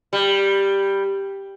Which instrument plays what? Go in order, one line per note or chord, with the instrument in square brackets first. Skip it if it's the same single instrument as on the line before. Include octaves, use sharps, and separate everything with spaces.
[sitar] G3